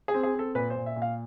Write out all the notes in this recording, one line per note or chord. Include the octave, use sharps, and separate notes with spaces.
G#4
C4
G#4
C4 A4
A#2 B4
C5
A#2
E5
A#2
F5